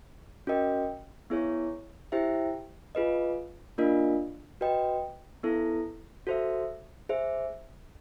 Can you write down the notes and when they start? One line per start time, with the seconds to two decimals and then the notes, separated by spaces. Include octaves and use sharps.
0.47 C#4 F#4 A#4 D#5 G5
1.30 B3 E4 G#4 C#5
2.12 E4 G4 C5 E5 G5
2.95 F4 G#4 B4 D#5
3.78 A#3 D4 F4 A#4 D#5
4.61 F#4 B4 D#5 G5
5.44 B3 E4 A4
6.27 F#4 A4 C5 E5
7.09 G#4 C5 E5